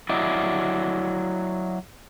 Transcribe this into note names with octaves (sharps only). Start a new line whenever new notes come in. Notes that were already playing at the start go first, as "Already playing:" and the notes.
F#3 E4 D5 D#5